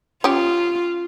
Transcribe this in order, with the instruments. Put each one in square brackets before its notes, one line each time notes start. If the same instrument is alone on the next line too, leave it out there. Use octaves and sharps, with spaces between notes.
[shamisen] C#4 G4 [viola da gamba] F4